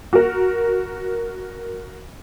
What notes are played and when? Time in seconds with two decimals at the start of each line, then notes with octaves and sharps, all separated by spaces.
0.13 F#4 A#4